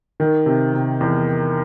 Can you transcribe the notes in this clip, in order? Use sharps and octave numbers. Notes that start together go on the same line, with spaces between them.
D#3
C3
C3
E2